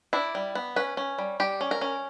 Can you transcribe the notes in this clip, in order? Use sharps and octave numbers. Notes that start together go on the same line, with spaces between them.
D4 E4
G3
B3
C#4 B4
C#4
G3
G3 G4
C#4
A#4
C#4